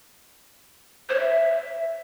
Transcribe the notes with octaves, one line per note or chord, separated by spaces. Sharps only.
C5
C#5
E5